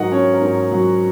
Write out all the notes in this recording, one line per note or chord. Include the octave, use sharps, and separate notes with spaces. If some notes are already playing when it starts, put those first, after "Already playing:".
Already playing: G#2 F#3 A#4 D#5 F#5
C#4 C#5
A#4
G#2
C#5
F#3